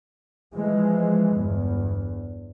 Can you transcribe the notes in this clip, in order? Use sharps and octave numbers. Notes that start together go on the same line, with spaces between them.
E3 F3 G#3
G1 E2